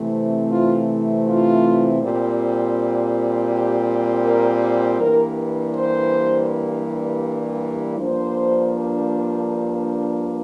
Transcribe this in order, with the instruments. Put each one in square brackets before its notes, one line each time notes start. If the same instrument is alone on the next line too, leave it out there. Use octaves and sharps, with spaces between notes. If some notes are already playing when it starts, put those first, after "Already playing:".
Already playing: [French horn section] C3 E3 A3 C4
F4
F4
A#2 G3 C4
G4
A#4
G2 E3 G3 A#3 A#4
C5
G2 F3 A#3 D4 C5